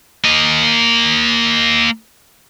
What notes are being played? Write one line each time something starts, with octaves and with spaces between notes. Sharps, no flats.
A#3 D#5